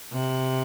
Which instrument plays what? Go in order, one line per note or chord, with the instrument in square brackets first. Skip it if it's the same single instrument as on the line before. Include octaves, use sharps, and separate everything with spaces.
[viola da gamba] C3